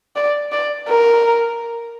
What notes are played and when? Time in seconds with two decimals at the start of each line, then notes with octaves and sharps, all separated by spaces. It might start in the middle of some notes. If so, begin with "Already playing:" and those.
0.16 D5
0.52 D5
0.89 A#4